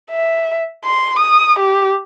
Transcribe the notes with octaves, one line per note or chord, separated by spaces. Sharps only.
E5
C6
D#6
G4